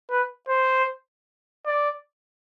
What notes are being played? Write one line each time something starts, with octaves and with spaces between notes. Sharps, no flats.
B4
C5
D5